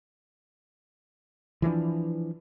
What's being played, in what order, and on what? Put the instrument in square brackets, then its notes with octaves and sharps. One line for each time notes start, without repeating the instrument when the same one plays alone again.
[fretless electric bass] E3 F3 G#3 D4